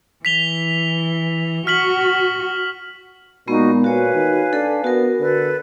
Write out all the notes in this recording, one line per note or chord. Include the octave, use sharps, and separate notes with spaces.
E3 B6 F7 G7
F#4 F6 B6 F#7
A#2 G#3 B3 D#4 F#4
F#4 B4 C#5 F5 G#5
D#3
D4 A4
B3 F#4 A#4
D3 A4 B4